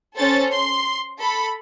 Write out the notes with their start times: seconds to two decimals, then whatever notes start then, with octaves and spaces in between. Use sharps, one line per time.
0.17 C#4 A4 C5 A6
0.52 C6
1.18 A4 B5